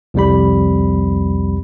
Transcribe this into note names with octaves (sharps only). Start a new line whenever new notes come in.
C2 F2 G3 B5